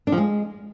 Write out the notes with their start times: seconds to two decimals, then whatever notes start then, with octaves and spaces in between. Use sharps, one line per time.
0.07 D4
0.12 F3
0.18 G#3